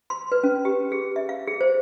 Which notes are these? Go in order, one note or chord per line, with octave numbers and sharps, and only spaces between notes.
C6
B4
C#4
G4
G#4
E5
F5
G#4
C5